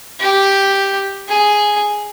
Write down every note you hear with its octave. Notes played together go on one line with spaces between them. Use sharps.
G4
G#4